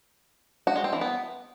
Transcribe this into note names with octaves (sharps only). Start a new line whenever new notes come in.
F#4
G#3
C4
E3
B3